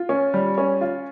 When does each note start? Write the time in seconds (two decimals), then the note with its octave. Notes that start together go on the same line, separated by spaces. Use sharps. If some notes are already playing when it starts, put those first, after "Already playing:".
Already playing: F4
0.09 C#4
0.34 G3
0.58 C#4
0.81 F4